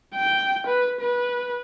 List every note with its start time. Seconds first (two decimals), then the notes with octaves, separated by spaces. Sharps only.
0.15 G5
0.67 B4
1.01 B4